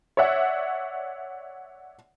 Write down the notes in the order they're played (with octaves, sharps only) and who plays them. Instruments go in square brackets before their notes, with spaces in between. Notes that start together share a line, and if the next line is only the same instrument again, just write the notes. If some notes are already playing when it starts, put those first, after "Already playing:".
[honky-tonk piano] C#5 D5 E5 F#5